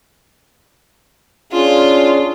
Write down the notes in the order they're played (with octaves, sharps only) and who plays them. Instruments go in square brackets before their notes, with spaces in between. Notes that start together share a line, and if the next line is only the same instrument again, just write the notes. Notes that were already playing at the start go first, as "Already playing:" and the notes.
[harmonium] C#4 D4 G#4 [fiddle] F4